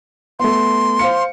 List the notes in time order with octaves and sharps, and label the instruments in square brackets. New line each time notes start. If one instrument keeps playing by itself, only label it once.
[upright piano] A3 B3 [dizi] C6
[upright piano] C5 F5 C#7